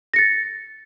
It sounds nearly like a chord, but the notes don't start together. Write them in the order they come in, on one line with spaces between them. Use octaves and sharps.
A#6 C#7 A6